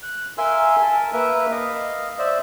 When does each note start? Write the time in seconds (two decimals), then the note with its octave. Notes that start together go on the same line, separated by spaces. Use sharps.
0.03 F#6
0.38 A#4 E5 F5 G#5 C6 E6
0.82 A#4 A5
1.13 A#3 A#4 B4 E5
1.51 D#5 F5
2.19 C5 D5 E5